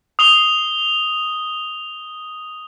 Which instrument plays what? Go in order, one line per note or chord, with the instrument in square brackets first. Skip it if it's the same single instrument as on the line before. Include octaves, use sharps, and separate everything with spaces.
[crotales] D#6 F7 G7